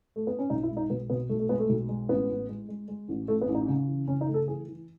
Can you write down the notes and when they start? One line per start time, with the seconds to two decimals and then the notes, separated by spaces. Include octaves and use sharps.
0.16 A3
0.27 B3
0.39 C#4
0.50 B1 D#4
0.63 E4
0.70 G#3
0.77 D#4
0.90 B1 B3
1.10 B2 B3
1.29 B1 A3
1.40 A3
1.49 G#3 B3
1.59 A3
1.69 B1
1.89 G#3
2.09 A1 B3
2.29 A1
2.49 G#3
2.69 G#3
2.88 G#3
3.08 A1
3.28 A1 A3
3.41 B3
3.48 A1
3.55 D#4
3.68 C#3
3.87 E3
4.07 C#3 C#4
4.21 D#4
4.28 A3
4.34 A4
4.48 E3 G#4
4.67 E3